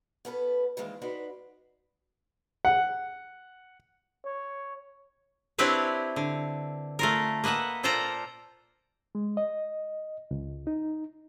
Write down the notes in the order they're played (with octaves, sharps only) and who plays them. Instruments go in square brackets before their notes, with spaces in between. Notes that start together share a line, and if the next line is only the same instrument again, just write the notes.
[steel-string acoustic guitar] B3 C#4 A4 B4
D#3 E3 G3 G#3 A#3 C4
D4 D#4 F#4 B4 C5
[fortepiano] F#5
[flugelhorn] C#5
[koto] C4 D4 E4 G4 B4 C#5
D3
A3 F4 A#4
A#3 B4 D#5 E5 F#5
A#2 F4 A4 C5 D5 A#5
[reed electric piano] G#3
D#5
C#2
D#4